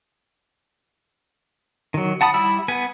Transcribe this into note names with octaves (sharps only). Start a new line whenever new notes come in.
D#3 F#3
F#5 A5 B5 D#6
G3 E4 E5 B5 E6
B3 B4 G#5